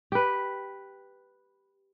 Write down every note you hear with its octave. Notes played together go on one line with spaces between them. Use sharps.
G4 B4